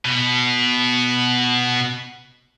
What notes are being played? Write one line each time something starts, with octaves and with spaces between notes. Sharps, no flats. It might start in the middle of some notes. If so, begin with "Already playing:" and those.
B2 B3